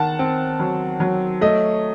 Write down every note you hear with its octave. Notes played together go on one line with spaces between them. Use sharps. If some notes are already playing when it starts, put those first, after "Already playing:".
Already playing: D#3 F#5 A5
C4
F#3
F#3
A3 D#5